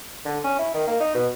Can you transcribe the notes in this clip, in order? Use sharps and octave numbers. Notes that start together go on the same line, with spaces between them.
D3
C#4
E4
D#3
A#3
D#4
B2